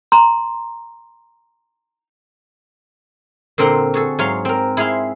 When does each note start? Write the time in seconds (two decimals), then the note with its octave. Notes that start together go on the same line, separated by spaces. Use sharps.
0.12 A#5 C6
3.58 A#2 D3 C4 A#4 F#5 C6
3.94 F#4 G#4 A4
4.19 G#2 F#3 G#4 C#5 F5 C6
4.45 C4 A#4
4.77 E4 G#4 E5 F5 C6